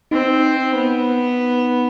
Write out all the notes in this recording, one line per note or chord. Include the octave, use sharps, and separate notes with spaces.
C4 D#4
B3